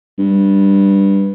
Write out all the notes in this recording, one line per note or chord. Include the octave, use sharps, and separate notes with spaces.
G2